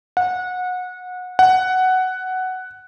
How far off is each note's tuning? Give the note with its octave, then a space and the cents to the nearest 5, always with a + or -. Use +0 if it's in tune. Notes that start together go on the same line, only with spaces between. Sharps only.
F#5 -25
F#5 +10